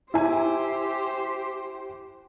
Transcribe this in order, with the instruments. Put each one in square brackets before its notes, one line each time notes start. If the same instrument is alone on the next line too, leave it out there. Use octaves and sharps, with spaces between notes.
[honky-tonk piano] E4 G#5 [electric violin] G4 C5